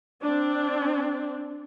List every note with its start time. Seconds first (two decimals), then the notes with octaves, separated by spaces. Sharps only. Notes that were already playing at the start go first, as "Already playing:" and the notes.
0.23 C4 D4